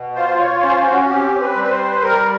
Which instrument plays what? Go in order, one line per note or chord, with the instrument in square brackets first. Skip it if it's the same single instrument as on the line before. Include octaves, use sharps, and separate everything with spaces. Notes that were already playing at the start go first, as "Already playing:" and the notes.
Already playing: [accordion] B2
F4 C5
C#5
C#4 C5
F#4
C4 G4
B4
G3
B4
C5
B4
G3 A#4